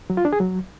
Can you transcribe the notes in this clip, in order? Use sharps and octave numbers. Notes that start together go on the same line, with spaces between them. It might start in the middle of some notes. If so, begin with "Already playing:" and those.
F#3
F4
D4
G#4
F#3